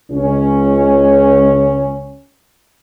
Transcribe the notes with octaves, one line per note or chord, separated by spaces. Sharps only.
C#2 C#4